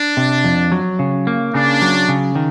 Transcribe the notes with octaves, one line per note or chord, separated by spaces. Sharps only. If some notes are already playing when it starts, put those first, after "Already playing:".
Already playing: D4
C3
F2
F#3
C#3
A#3
C#3 D4
F#3
C#3
D#3